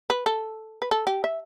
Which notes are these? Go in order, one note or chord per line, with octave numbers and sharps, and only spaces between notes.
B4
A4
B4
A4
G4
E5